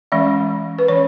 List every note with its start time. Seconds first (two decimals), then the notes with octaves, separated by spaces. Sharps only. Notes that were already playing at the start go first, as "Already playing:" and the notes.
0.12 E3 G#3 C#4 E5
0.79 B4
0.88 E3 C#4 C#5